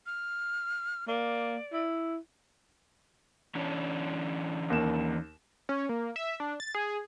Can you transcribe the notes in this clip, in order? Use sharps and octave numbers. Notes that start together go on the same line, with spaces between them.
F6
A#3 D5
E4
E3 C#4 D4
D#2 A#3 E7
C#4
A#3
E5
D4
A6
G#4